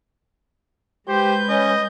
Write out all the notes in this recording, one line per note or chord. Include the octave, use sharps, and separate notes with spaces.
G#3 G4 B4 C5 G6
C#4 D#5